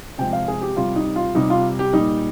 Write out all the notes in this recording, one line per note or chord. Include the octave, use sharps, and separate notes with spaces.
C3 F3 G#3 G5
F5
G#4
G4
C3 G3 F4
D#4
F4
C3 G3 D#4
F4
G4
A#2 G3 D#4